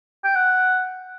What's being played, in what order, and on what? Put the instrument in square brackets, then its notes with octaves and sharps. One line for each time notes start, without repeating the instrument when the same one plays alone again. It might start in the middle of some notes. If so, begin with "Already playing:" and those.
[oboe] G5
F#5